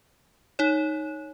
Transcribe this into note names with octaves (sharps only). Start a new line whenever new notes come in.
D#4 C#5